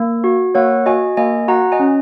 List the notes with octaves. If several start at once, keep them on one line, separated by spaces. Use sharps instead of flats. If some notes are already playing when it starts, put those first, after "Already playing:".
Already playing: A#3
F#4
A#3 C#5 F#5
F#4 D#5 G#5
A#3 D#5 G#5
F#4 F#5 A#5
D#5 G#5
C#4